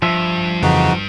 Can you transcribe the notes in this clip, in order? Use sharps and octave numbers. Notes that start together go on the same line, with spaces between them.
G2 F3 E5
F2 C#3 E3 D#4 F#4